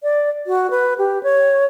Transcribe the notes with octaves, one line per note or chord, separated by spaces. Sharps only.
D5
F#4
B4
G4
C#5